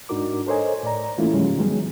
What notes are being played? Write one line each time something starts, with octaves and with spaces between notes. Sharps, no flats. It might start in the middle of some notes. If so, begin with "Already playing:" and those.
G#2 D4 D#4 F#4 A#4 D6
A4 A#4 C5 C#5 D#5 G#5
A2 D5 A#5
E3 A3 A#3 C#4 E4 F4
G#2 C#3 F3 G3 G#3 C#4
D#3 F#3 G#3 B3 G#4